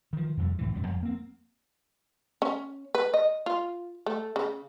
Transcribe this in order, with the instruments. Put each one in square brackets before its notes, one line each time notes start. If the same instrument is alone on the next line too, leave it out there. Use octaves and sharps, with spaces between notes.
[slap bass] D#3 F3
F2 C3 G3
C#2 A2 E3
E1 F#2 G3
F2
A#3 C4
[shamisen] C#4
B4
D#5
F4
A3
C#3